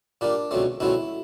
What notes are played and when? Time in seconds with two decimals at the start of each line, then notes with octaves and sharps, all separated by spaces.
0.21 A#2 G3 A#3 D4
0.51 C#2 B2 F#3 A3 C4
0.80 C#2 B2 F#3 A3 C4 E4